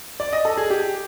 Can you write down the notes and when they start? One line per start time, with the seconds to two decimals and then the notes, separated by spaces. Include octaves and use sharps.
0.20 D5
0.33 D#5
0.45 A4
0.57 G#4
0.70 G4